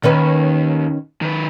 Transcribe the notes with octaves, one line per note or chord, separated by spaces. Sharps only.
D#2 D#3 C#4 B4
D#3 B4